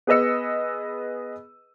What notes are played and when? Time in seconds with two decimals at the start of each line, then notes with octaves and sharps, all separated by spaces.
0.07 B3 G#4 B4 D#5 E6 C#7